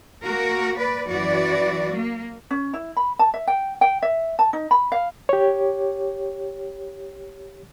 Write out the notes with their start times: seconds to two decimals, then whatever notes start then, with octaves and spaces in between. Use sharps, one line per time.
0.24 A#3 F#4 A#4
0.76 B4 D5
1.07 F#2 E3 F#4 D5
1.92 A#3
2.51 C#4
2.73 E4
2.97 B5
3.19 A5
3.34 E5
3.47 G5
3.81 G5
4.02 E5
4.39 A5
4.53 D#4
4.71 B5
4.92 F5
5.29 G4 C#5